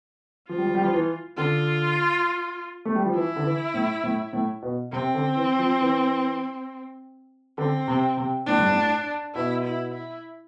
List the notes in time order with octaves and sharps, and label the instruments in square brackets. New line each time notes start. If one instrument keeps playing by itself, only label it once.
[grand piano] F3 [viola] F4
[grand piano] G3
F3
G3
F3
E3
[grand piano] D3 [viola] F4
[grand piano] A3
G3
F3
[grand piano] E3 [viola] E4
[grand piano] D3
E3
A2
A2
A2
B2
[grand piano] C3 [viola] C4
[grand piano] D3
E3
F3
E3
[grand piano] D3 [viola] C4
[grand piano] C3
C3
[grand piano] A2 [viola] D4
[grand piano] G2
A2
[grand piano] B2 [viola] E4
[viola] E4
E4